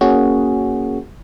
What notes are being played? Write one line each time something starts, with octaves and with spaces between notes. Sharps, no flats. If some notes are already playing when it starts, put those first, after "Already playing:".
A#3 C#4 F#4 G#4